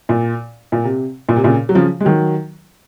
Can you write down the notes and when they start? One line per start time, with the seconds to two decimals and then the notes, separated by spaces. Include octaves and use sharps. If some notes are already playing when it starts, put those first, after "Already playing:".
0.09 A#2
0.72 A#2
0.84 C3
1.29 A#2
1.36 C3
1.44 A#2 C#3
1.69 F#3
1.75 C#3 F3
2.00 G#3
2.05 D#3 F#3